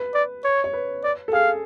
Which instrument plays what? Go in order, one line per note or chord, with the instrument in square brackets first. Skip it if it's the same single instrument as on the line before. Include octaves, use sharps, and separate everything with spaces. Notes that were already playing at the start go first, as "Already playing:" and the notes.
Already playing: [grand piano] B4
[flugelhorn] D5
C#5
[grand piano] C#5
B4
[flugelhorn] D5
[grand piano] A4
[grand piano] G#4 [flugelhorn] F5